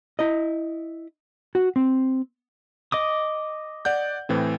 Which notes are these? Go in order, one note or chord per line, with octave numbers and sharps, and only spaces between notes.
E4 D#5
F#4
C4
D#5 D6 D#6
D5 F#5 G6
A2 E3 C4